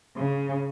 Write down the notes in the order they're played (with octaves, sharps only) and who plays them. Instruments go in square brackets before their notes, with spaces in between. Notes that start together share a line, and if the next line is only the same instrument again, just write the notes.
[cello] C#3